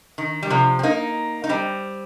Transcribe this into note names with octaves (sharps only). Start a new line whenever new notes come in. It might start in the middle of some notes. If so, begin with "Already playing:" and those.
D#3
G3
C3 F3
C4
A#3 D#4
D#4
G3 C4